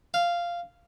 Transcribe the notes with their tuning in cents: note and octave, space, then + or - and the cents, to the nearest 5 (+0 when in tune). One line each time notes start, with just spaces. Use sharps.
F5 -10